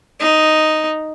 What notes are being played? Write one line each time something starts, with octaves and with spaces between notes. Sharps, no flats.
D#4